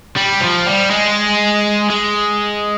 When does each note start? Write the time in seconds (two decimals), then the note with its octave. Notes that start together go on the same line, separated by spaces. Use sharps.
0.17 G3
0.41 F3
0.66 G3
0.91 G#3
1.90 G#3